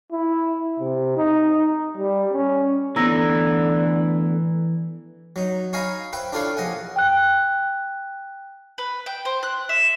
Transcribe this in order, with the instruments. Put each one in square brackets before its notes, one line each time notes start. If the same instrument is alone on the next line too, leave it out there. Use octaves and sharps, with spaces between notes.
[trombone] E4
C3
D#4
G3
C#4
[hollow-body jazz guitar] A2 B3 B4 [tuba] D3 [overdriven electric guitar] E3 [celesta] A#5 E6 A#6
[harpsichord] F#3 D#4
D#4 C#5 F5 G#5 A#5 B5
B4 C5 E5 G5
D4 E4 F4 A4 C#5 F5
A#1 D#5 F#5 G#5
[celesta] G5 F#6
[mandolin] B4
G5
C5
F#6
E5